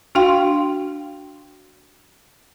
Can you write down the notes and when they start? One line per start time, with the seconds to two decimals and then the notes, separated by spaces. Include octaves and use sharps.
0.15 D4 F#4 F5 G5 C6